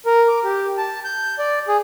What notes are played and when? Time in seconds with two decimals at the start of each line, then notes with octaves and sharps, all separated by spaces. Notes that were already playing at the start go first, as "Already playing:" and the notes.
0.06 A#4
0.28 D6
0.44 G4
0.77 A5
1.04 G6
1.39 D5
1.68 G#4